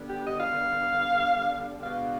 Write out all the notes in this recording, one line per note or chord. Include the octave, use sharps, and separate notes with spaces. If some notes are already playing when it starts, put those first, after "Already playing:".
Already playing: D3 G3 B3
G4
D#5
F5
B2 G#3 B3 D4 F5